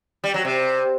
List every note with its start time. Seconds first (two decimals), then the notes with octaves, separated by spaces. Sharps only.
0.24 G3
0.34 F#3
0.45 C3